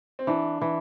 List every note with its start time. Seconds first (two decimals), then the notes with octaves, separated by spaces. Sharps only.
0.19 C4
0.27 E3 D4
0.61 E3